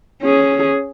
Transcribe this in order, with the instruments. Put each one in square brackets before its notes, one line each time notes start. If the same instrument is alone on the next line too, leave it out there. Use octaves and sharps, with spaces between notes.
[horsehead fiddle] C#4 G#4